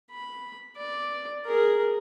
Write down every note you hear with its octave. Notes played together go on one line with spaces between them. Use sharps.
B5
D5
G#4 A#4